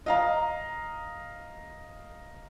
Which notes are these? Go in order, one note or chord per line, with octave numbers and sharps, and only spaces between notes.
D#5 F5 A#5